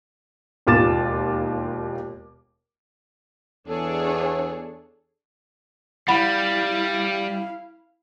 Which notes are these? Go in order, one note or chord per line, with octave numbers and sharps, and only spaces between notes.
E1 D#2 F4 D6 A6 E7
E2 D4 G#4 A4 C#5
G3 E4 F5 F#5 B5